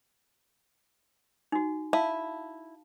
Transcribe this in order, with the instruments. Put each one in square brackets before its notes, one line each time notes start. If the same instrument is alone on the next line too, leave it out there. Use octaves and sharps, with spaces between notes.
[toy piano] D#4 F#4
[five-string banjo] E4 [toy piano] F5 A5